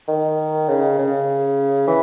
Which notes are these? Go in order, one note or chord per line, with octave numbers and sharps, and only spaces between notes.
D#3
C#3
C#3
E3